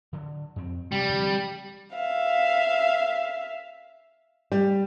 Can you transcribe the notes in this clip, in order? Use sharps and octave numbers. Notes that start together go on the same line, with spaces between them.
D3 F#3
F2 C4
C3 G3
D3 F3 C4
E5 F5
G3